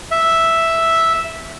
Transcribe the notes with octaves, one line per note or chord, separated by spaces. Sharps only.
E5